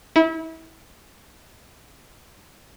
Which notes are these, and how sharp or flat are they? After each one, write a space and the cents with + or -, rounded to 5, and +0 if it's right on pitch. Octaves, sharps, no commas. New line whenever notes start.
E4 -30